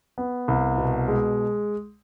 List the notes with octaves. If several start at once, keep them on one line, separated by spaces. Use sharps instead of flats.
B3
C2
B2
G#3